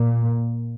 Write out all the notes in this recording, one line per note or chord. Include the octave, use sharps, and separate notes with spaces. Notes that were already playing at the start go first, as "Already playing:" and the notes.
Already playing: A#2